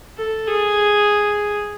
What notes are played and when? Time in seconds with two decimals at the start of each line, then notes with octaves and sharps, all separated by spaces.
0.18 A4
0.47 G#4